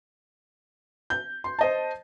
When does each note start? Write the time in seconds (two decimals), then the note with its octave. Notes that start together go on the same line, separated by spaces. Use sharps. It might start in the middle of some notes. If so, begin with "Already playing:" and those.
1.10 G6
1.44 C6
1.59 C5 D#5 A5